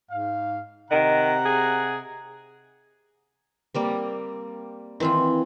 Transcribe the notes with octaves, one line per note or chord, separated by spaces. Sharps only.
G#2 F5
C3 D#3 F#5 A#5
G#4
G3 A#3 C4
D#3 E3 C4 F4